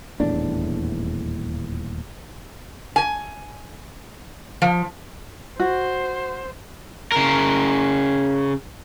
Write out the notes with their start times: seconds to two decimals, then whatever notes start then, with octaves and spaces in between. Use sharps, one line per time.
0.20 D#1 E2 A2 D4
2.96 G#5
4.62 F3
5.60 F#4 C5
7.12 C#3 A#4